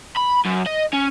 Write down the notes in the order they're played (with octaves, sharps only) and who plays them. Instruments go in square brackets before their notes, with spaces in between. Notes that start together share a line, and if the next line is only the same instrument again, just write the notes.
[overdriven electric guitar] B5
F#2
D#5
C#4